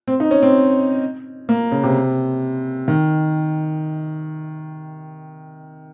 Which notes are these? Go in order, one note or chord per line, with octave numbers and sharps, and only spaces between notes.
C4
D#4
C#4
C4
A#3
C#3
C3
D#3